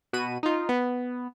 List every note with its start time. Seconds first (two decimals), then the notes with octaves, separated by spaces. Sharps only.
0.13 B2 F#4 B5 D#7
0.43 D#4 F4
0.69 B3